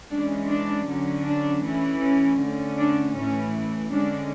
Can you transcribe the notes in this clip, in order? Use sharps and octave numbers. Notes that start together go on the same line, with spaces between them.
E3 G#3 C#4 D4
D4
D3 F#3 C#4
D4
E3 A3 C#4
C#4
D3 A3 C#4
D4
A2 E3 A3 C#4
D3 G#3 C#4 D4